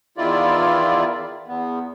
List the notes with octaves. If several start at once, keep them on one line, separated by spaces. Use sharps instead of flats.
E2 D#3 E4 F4 D5
E2 B3